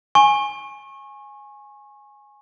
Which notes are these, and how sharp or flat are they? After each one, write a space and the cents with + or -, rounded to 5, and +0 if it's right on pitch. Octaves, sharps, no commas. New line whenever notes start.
G#5 +0 C#6 -30